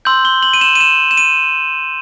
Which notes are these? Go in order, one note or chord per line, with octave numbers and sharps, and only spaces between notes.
C6 E6 G6 F#7
G7
F#7
D#7
E7
D#7
E7
E7
D#7